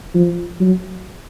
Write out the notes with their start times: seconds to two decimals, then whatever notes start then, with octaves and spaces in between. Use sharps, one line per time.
0.14 F3
0.60 F#3